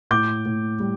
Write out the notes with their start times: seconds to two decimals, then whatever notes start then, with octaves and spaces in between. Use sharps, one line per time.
0.11 A2 D6 G6
0.46 A2
0.80 G3